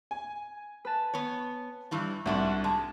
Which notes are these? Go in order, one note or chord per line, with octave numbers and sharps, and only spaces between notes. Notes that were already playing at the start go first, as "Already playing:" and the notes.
G#5
B4 A5
B3 C#5
G2 E3 G3
C2 G#2 D4 F#4
G#3 A5